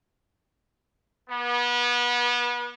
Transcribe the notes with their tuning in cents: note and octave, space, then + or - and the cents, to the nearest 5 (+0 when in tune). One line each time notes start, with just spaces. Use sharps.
B3 -30